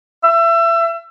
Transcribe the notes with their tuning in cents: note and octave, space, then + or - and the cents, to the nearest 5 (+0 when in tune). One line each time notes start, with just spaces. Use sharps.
E5 +30